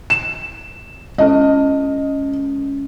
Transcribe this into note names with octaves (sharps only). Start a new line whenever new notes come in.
E7
G#3 C#4 A4 D#5